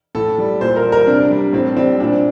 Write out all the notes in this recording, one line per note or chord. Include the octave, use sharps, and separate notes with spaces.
A2 A4
G3
A#2 C5
A#4
G3
A#4
C3 D4
G3
A2 C4
G3 C4
A#2 D4